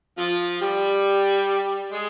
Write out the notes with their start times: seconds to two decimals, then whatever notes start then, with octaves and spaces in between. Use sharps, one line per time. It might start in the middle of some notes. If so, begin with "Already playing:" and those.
0.18 F3 F4
0.61 G3 G4
1.91 G#3 G#4